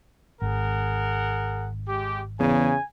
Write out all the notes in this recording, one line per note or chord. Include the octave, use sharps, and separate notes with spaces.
G#1 G#4 A#4 F#5
G#3 G4
E2 C#3 G#5